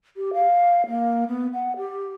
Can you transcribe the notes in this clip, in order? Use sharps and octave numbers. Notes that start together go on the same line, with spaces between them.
G4
F5
A#3
B3
F#5
G4